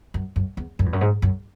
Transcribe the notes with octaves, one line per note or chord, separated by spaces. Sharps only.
F#2
F#2
E2
F#2
E2
F#2
G#2
F#2